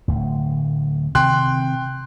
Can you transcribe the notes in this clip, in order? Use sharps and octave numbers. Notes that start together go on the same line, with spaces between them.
D1 D2
C3 D#3 C4 G5 C6 F#6